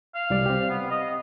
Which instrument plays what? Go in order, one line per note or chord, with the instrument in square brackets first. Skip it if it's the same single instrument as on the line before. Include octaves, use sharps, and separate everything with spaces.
[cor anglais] F5
[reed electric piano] C2 G3 D5
C4 G4
[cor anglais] B3
D#5